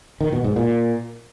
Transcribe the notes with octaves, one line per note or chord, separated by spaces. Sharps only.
D#3
B2
G#2
A#2